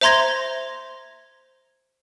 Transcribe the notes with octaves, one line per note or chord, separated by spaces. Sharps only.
C5 E5 A#5 C6 G#6 A#6